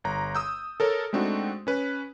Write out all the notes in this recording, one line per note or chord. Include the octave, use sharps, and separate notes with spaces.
G1 A#5
D#6 E6 G6
A4 A#4 C#5
G#3 A3 C4 D4 D#4 F#4
C#4 B4